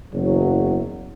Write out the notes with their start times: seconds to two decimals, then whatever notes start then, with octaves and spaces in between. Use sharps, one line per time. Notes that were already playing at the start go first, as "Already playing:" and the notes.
0.13 F#1 E2 F#3